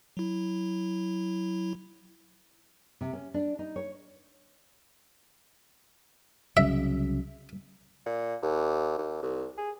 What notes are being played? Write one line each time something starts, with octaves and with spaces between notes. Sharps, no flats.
F#3 E4
C3
C#4
D4
D#4
C#5
C2 C#3 F#3 E5
A#2
D#2
D#2
C2
G#4